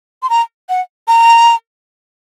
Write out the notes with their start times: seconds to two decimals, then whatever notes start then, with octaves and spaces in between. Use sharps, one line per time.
0.23 C6
0.30 A#5
0.69 F#5
1.08 A#5